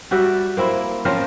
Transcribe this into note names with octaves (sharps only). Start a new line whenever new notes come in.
G3 F#4 D5 E5
A#3 C4 E4
F3 C4 C#4 A#4